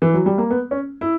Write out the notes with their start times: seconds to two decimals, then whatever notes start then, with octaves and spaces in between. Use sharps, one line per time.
0.02 E3
0.14 F#3
0.26 G3
0.38 A#3
0.51 B3
0.71 C#4
1.01 E4